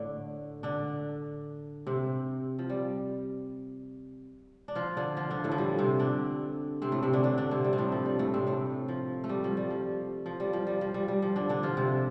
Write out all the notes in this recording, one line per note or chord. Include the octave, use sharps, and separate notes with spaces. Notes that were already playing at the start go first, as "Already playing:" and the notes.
Already playing: A2 D3 A3 D4
D3 D4
C3 C4
F3
G3
D4
F3 F4
D3 D4
F3 F4
D3 D4
A2 A3
F3
G3
C3 C4
D3 D4
C3 C4
A2 A3
C3 C4
D3 D4
D3 D4
D3 D4
C3 C4
G3
C4
A2 A3
F3
G3
A2 A3
C3 C4
A2 A3
F3
A3
G3
F3
G3
F3
F3
G3
F3
G3
F3
G3
G3
F3
D3 D4
D3 D4
F3 F4
C3 C4